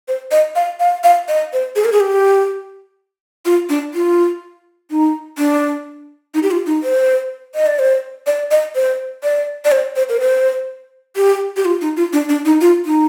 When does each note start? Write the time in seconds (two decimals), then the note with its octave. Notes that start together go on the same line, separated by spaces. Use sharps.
0.08 C5
0.31 D#5
0.55 F5
0.80 F5
1.04 F5
1.28 D#5
1.53 C5
1.76 G#4
1.85 A#4
1.92 G#4
2.00 G4
3.45 F4
3.69 D4
3.94 F4
4.90 D#4
5.38 D4
6.34 D#4
6.43 G4
6.51 F4
6.66 D#4
6.83 C5
7.55 D#5
7.66 D5
7.79 C5
8.27 D5
8.51 D#5
8.75 C5
9.23 D5
9.65 D5
9.72 C5
9.96 C5
10.09 A#4
10.20 C5
11.16 G4
11.56 G4
11.65 F4
11.81 D#4
11.97 F4
12.13 D4
12.29 D4
12.45 D#4
12.61 F4
12.85 D#4